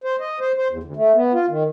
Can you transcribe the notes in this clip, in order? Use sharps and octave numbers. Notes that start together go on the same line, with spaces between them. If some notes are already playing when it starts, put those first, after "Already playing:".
C5
D#5
C5
C5
E2
D2
A3
B3
F4
D#3